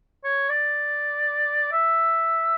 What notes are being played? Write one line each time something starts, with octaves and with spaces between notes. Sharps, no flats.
C#5
D5
E5